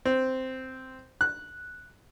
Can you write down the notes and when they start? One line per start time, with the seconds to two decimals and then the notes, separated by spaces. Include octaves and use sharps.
0.05 C4
1.21 F#6